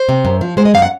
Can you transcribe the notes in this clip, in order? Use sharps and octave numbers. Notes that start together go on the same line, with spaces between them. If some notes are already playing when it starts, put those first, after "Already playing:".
Already playing: C5
C3
F#2
F3
G#3 C5
D#5
F#2 F5
F#5